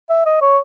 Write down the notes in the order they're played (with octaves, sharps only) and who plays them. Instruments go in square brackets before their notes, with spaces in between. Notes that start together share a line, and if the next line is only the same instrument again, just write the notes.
[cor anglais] E5
D#5
C#5